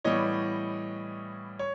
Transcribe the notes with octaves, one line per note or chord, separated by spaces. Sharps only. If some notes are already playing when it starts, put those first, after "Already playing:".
A2 E3 G3 B3 C#5 D#5
C#5